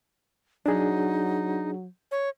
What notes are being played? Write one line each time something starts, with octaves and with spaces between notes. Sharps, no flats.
F#3 D4 D#4 G#4
C#5